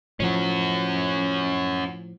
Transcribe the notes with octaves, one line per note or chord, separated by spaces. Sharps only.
A2 F3 C#4 F#4